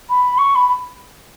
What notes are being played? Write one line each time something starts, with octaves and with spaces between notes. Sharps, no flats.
B5
C#6
B5
B5